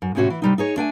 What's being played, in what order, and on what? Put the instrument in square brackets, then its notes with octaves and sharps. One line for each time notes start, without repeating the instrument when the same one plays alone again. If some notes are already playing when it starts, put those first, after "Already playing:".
[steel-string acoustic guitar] F#2
E2 A2 C3 C#4 F#4 C#5
E3
C3 G3 D#4
D#4 G#4 C#5
A3 D4 G5 G#5